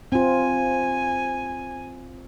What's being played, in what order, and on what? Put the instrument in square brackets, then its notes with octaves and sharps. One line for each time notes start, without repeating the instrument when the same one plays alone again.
[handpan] C4 F4 [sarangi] G#5